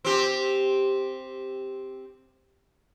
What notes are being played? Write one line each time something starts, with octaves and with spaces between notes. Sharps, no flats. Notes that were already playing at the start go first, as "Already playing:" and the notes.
C4 G4